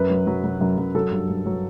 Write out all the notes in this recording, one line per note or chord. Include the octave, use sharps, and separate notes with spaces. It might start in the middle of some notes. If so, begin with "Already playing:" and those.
Already playing: F#2 B4
F#3
F#3
F#3
F#2
F#2
F#3 A4
G2
G2
F#3